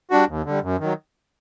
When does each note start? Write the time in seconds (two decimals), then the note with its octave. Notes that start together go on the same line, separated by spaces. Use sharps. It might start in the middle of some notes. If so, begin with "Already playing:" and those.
0.11 G3 D4 F#4
0.28 D#2
0.45 D3 G3
0.63 F#2
0.80 D#3 F#3